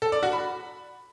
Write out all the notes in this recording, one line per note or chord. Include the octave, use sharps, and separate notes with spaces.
A4
D5
F#4
B5